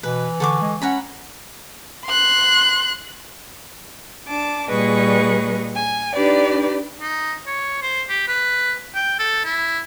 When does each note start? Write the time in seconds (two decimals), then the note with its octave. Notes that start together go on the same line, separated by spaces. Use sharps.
0.03 B2 E3 B4
0.40 D3 A4 C#6 D6
0.61 G#3
0.82 C#4 F#5 A#5 B5
2.05 C6 F#6
4.27 D4 A5 D6
4.69 A#2 G3 G#4 B4 D#5 C#6
5.75 G#5
6.14 D4 D#4 G4 B4 D5
7.01 D#4
7.47 C#5
7.82 C5
8.09 G4
8.28 B4
8.95 G5
9.19 A4
9.45 E4